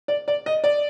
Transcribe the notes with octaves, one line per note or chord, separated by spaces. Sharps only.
D5
D5
D#5
D5